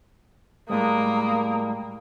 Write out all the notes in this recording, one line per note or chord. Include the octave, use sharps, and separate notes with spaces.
A2 G3 G#3 A#3 A#5 D#6